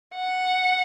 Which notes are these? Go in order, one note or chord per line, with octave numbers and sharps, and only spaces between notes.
F#5